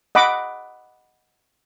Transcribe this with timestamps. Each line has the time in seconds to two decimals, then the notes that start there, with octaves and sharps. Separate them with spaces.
0.15 D#5 F#5 B5 D6